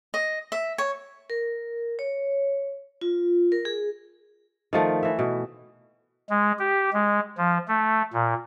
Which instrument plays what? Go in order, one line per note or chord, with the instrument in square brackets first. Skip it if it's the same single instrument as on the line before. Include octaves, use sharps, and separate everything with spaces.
[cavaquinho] D#5
E5
C#5
[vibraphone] A#4
C#5
F4
A#4
G#4
[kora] D#3 F3 A3
E3 E5
B2
[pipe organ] G#3
G4
G#3
F3
A3
A#2